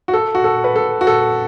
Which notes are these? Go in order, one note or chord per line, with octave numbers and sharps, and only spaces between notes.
F#4
A4
F#4
A4
B4
A4
F#4
A4